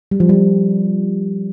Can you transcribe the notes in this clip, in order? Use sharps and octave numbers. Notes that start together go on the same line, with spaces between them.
G3
F3
G3